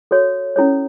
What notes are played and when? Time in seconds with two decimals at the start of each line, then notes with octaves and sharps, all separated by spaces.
0.11 F#4 A4 C#5
0.56 C#4 E4 A4 C#5